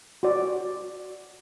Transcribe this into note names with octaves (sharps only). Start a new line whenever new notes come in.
F#4 D5